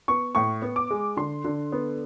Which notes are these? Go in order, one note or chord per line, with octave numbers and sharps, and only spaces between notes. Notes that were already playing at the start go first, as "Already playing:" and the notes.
B3 C#6
A2 C#6
B3
D6
G#3
D3 C6
D3
B3